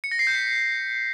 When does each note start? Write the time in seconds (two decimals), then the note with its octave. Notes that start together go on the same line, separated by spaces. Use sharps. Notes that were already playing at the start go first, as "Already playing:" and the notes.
0.04 C#7
0.11 A#6
0.19 C7
0.27 G6
0.35 B6